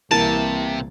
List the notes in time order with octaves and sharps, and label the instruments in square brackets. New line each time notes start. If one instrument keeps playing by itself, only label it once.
[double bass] C2 [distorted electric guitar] C3 [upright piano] E3 A#3 [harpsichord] A5